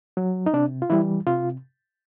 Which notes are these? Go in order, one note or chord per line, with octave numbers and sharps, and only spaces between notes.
F#3
D#4
C3 D4
F4
E3 G3 E4
C3 F4